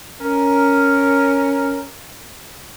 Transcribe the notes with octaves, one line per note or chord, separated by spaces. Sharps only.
C#4 A#4